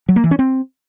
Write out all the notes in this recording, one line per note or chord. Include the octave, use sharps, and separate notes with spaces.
F#3
A#3
E3
C#4
C4